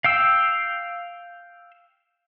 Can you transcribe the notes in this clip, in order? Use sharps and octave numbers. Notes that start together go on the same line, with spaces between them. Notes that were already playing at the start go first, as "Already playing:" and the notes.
F5 G5 E6